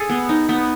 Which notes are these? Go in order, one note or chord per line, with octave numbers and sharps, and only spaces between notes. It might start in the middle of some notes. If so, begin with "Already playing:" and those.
Already playing: G#4 A4
B3
D#4
B3